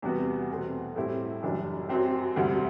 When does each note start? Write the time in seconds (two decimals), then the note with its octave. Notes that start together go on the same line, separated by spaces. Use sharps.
0.02 E2 C3 G3 B3 F#4
0.50 E2 B2 A3 C4
0.96 A2 G3 C4 E4 G4
1.43 F#1 F#2 E3 G3 D4
1.89 F#2 F#3 C4 G4
2.36 E1 D2 C3 G3 C4